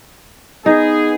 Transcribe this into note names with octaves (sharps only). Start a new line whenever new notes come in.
B3 D#4 G#4